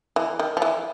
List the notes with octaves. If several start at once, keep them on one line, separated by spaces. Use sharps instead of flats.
E3
D#3
F3
E3